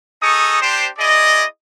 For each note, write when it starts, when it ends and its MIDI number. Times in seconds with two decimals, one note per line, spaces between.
0.23 0.58 63
0.23 0.58 68
0.23 0.58 69
0.23 0.58 85
0.23 0.58 87
0.61 0.88 62
0.61 0.88 67
0.61 0.88 72
0.99 1.44 64
0.99 1.44 68
0.99 1.44 74
0.99 1.44 75